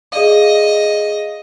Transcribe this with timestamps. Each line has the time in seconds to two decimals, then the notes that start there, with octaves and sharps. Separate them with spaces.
0.13 G#4 D5 D#5 F5